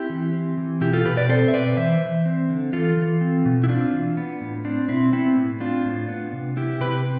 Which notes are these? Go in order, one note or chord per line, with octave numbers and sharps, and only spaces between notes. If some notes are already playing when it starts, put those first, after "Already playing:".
Already playing: C4 E4 G4
E3
C4
E3
B2 E4 G4
F4 A4
B2 G4 B4
B4 D5
C4 A4 C5
E5
B2 B4 D5
E3 C5 E5
E3
C4
D3
E3 F4 A4
E3
C4
B2
E4
C4 D4 F4
E3
B3
A2
C4 D4
B2 C4 E4
B3 C4 E4
A2
C4 D4 F4
A2
B3
C3
B3 E4 G4
C3 G4 B4
C4